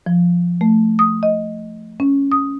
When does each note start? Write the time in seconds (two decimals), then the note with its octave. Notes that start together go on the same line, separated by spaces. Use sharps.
0.06 F3
0.61 A3
0.99 D#6
1.23 D#5
2.00 C#4
2.32 D#6